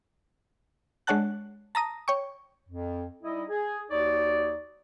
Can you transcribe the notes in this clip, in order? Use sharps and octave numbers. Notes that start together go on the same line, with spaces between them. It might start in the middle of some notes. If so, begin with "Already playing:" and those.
G#3 D4 C#5 F#5 A5 F#6
A5 A#5 D#6 A#6
C#5 G5 C#6
F2
G3 D#4 E4 D#5
G#4
D#2 D#4 F#4 C#5 D5